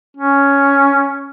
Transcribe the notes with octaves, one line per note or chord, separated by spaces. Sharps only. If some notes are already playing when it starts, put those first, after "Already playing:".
C#4